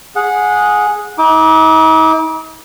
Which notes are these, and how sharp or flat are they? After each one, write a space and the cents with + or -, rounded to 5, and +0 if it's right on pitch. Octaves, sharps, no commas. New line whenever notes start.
G#4 +0 F#5 -20
D#4 +45 D6 +0